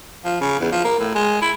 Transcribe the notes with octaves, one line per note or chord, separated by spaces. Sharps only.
F3
C#3
E2
F3
A#3
A2
G#3
E4